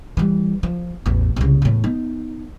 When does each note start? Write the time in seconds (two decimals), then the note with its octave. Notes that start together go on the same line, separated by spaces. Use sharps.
0.17 E3 G3
0.63 F3
1.06 A1 E2
1.36 C2 C#3
1.62 E2 A2
1.84 B3 D#4